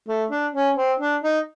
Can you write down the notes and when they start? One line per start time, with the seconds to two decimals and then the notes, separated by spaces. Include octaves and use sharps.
0.08 A3
0.31 D4
0.54 C#4
0.76 C4
1.00 D4
1.23 D#4